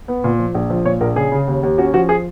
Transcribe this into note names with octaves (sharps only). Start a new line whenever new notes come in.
B3
A#2
F3
A#1
F3
A#2 C#5
A#1 A#4
C#3 G#4
C#3
D#2
D#2
C#4 F#4
F3 F#4
G#4